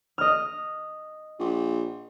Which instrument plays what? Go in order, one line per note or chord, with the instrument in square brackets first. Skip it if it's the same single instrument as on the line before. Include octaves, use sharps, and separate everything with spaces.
[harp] D#5 F6
[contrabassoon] A#1